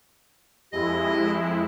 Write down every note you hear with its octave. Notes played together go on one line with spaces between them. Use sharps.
F2 G#3 E4 G4 D#5